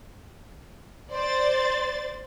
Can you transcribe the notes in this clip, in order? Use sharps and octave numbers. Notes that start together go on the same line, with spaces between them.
C5 D5 A6